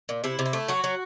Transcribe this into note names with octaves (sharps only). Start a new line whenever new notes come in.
A#2
C3 E4
C3
E4
A3
F#3 F#4
F#3